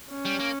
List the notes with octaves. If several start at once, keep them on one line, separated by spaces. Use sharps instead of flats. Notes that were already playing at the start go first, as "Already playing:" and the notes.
C#4
G3
A#3